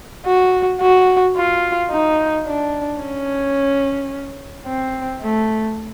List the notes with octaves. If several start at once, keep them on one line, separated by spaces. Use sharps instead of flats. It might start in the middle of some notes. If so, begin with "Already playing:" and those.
F#4
F#4
F4
D#4
D4
C#4
C4
A3